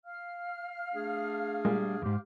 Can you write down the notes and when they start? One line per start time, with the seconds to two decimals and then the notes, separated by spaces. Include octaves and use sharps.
0.05 F5 F6
0.94 A3 D4 G#4
1.65 A#2 G3 G#3
2.02 E2 G#2 G4